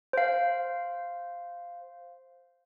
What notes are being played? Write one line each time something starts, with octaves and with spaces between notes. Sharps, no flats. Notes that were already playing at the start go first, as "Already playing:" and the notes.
C5 F5